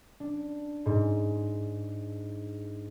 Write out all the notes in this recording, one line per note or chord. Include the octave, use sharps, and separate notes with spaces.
D4
G#2